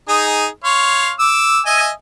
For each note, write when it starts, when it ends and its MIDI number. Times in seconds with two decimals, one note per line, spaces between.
0.09 0.46 63
0.09 0.46 68
0.64 1.11 73
0.64 1.11 77
0.64 1.11 84
1.19 1.61 86
1.19 1.61 88
1.66 1.89 75
1.66 1.89 76
1.66 1.89 80